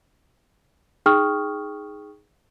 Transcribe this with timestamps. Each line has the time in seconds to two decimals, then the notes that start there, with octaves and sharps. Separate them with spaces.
1.06 D#4 G#4 G5 C#6 D#6 F6